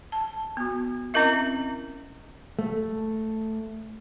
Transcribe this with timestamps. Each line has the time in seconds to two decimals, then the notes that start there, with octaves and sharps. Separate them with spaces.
0.12 A5
0.57 B3 F#4
1.14 C4 C#4 E4 A#4 D#5 E5
2.59 A3